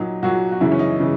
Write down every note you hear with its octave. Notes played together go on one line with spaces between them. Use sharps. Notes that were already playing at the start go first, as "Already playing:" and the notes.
Already playing: A#2 F#3 D#4
A#2 F#3 F#4
F#4
F#2 C#3 E3 E4
C#4
D#4
C#3 E3